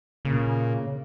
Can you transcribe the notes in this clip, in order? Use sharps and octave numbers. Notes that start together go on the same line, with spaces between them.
A#2 C#3